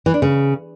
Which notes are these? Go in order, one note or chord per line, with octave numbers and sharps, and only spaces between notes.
E3
D4
C#3